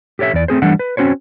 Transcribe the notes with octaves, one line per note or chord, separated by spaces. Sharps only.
G4 A4 C#5 D5 E5
E2 D5
A3 C4 G#4 C5
E3 G3 A3 D4 F#5
B4
C4 C#4 F#4 C5 C#5